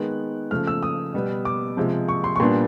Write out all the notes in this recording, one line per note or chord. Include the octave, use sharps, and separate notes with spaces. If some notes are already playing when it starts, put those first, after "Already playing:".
Already playing: D#3 G#3 B3 F#6
C#3 F3 A3 F6
E6
D#6
B2 G3 B3
D6
C3 F3 G#3
C#6
C6
C#6
A#2 G3 B3 D4 C6